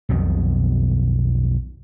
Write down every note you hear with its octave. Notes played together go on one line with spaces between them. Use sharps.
B1 F2 B2 D#3